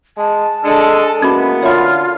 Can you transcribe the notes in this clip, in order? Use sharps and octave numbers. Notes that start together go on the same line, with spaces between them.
G#3 A5
G#3 D4 A4
E3 G#3 A#3 B3 C#4 F#4 B5
D3 F4 C#5 E5 B5